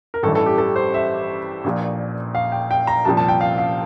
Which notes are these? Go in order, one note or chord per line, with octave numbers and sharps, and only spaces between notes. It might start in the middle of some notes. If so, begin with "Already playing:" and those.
A#4
A1 G2 E3 A4
A4
G4
A4
C5
E5
A#1 A#2 F3
F5
G5
G5
A#5
C2 A#2 F3 A5
A5
G5
F5
F5